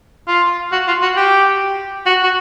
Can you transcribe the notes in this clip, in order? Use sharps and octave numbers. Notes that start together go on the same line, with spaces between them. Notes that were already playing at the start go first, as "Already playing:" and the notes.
F4
F#4
F4
F#4
G4
F#4
F#4